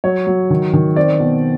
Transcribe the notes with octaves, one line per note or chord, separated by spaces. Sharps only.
F#3 C#5
F#3
D#3
D#3
C4 D5
B2